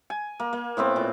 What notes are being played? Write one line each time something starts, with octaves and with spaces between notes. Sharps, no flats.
G#5
A#3
A#3
A2 B3 C4 D6
A#2